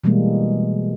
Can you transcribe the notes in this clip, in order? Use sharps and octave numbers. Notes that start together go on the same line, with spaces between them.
B2 E3 G3 G#3 A#3